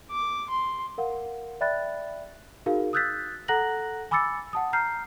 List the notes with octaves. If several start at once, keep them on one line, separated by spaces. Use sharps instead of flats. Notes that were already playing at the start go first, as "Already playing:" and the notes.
D6
C6
A#4 F5 F#5
D5 E5 G5 B5 F#6 A6
D#4 F#4 G#4 A#4 F5
D#6 E6 F#6 G6 A6 B6
A4 F#5 A#5 F#6 A#6 F#7
G#5 B5 D6 E6 A6 C#7
F#5 A5 D#6
A#5 F6 G6 C7